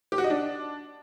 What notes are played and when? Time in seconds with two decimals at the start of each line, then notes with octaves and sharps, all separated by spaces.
0.12 G4
0.18 F#4
0.24 D#5
0.30 D4